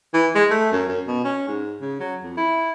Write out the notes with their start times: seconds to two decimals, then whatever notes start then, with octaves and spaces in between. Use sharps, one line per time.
0.14 E3
0.35 G#3
0.50 A3
0.72 F#2
0.89 F#2
1.07 B2
1.25 C#4
1.48 G#2
1.81 C#3
2.00 F#3
2.23 F2
2.37 E4